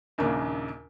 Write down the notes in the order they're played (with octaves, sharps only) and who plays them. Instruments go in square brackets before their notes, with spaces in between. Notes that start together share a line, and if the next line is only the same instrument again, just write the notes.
[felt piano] A#1 D#2 C#3 A#3 D4